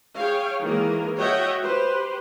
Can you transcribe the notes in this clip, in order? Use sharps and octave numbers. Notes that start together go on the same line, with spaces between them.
G#4 C#5 F5 G5
D#3 E3 G#3 A#3 G#4 A#4
F#4 C#5 D#5 E5 F#5 G5
G4 B4 C5